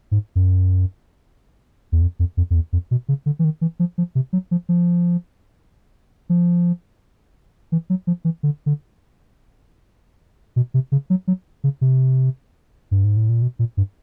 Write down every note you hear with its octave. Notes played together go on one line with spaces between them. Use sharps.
G#2
F#2
E2
F2
F2
F2
F2
E2
F2
B2
C#3
D3
E3
D#3
E3
F3
F3
C3
F#3
F3
F3
F3
E3
F#3
F3
E3
D3
D3
B2
C3
C#3
F#3
F#3
C#3
C3
G2
G#2
A2
A#2
B2
A#2
G2